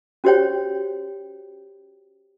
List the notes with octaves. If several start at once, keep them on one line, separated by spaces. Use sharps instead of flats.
C#4 F#4 G4 C5 C#5 G5